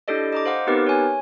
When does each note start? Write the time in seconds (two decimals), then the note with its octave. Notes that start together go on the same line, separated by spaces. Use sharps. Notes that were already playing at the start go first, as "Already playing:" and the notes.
0.08 D4 E4 G4 A4 D5 D#5
0.33 D#5 A#5 D6
0.46 C5 F5 F#5 D6
0.67 B3 C4 D#4 G4 A#4 B4
0.87 C#5 G#5